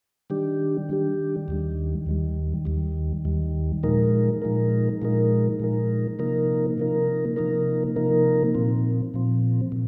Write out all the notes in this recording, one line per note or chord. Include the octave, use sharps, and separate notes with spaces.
D#3 G3 D4 G4
D#3 G3 D4 G4
D#2 D#3 G3
D#2 D#3 G3
D#2 D#3 G3
D#2 D#3 G3
A#2 F3 G#3 D#4 A#4
A#2 F3 G#3 D#4 A#4
A#2 F3 G#3 D#4 A#4
A#2 F3 G#3 D#4 A#4
C3 F3 A#3 D#4 A#4
C3 F3 A#3 D#4 A#4
C3 F3 A#3 D#4 A#4
C3 F3 A#3 D#4 A#4
A#2 F3 C4
A#2 F3 C4
A#2